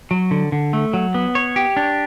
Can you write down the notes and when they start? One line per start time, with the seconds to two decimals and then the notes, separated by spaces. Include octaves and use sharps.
0.11 F#3
0.31 D3
0.52 D3
0.73 A3
0.94 F#3
1.14 B3
1.35 C#5
1.56 G4
1.77 D4